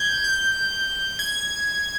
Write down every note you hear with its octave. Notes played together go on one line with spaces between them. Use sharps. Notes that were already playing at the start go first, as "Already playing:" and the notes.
Already playing: G6 G#6
G6
G#6